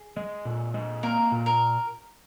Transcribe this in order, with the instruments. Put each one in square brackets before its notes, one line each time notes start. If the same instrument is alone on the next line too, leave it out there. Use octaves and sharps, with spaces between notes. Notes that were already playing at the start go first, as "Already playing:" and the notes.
Already playing: [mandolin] G#4
[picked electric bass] G#3
A#2
G#3
[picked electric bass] A#3 [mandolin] A#4
[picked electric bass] A#2
[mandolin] A#4